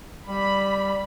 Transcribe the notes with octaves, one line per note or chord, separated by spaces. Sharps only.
G3 B5